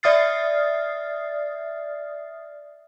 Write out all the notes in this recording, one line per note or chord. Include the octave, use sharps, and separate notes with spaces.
D5 E5 D#6 F6 A6 C7